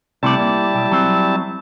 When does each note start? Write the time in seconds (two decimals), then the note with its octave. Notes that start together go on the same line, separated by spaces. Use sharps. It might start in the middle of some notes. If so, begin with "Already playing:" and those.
0.23 C3 G3 A3 E4 D5 A5
0.40 A#3
0.74 B1 G4
0.92 F#3 C4